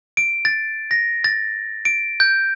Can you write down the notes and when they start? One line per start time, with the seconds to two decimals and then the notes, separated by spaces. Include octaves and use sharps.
0.17 D7
0.45 A6
0.91 A#6
1.24 A6
1.85 D7
2.20 G6